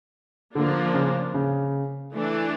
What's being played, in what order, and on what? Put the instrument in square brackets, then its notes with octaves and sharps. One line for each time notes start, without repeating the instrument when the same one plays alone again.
[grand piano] D3 [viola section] F3 A#3 D4
[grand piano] C#3
C#3
[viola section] E3 A3 D4